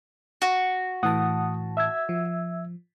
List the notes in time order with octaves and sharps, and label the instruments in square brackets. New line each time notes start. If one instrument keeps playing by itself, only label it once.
[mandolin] F#4
[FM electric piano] A2 E3 A5 [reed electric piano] F#5 D#6
[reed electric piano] E5 E6 G#6
[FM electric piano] F3